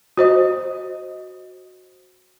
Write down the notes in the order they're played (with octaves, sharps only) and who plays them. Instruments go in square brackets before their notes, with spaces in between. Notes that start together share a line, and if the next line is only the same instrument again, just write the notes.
[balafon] F#4 C5 D#5